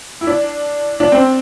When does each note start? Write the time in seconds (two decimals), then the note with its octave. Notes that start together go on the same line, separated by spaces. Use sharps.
0.21 E4
0.27 D4
1.00 D4
1.12 C4